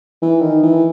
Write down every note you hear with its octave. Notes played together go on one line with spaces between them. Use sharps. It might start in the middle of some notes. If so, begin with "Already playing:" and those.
E3
D#3
E3